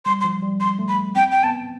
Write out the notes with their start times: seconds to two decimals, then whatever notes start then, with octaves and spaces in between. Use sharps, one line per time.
0.05 G3 C6
0.21 C6
0.24 F3
0.43 G3
0.60 G3 C6
0.79 A3
0.88 B5
1.16 C4 G5
1.32 G5
1.43 B3 A5